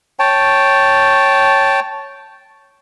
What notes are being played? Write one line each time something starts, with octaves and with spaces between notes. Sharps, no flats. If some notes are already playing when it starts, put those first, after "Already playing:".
C#5 G5 A5